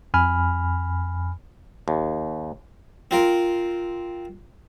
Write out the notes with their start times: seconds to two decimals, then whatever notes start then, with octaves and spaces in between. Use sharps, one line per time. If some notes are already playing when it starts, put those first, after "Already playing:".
0.14 F2 G#5 B5 F6
1.88 D#2
3.11 C4 F4 A#4